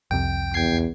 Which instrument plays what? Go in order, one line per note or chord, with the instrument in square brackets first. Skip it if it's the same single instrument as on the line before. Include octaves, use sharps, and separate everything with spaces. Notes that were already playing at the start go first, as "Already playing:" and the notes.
[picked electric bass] C2 F2 C3 [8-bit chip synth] G5
[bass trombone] E2 [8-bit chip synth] G5 G#6 C7